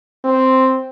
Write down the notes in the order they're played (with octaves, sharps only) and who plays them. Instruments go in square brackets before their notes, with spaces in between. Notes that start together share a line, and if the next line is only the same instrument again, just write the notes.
[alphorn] C4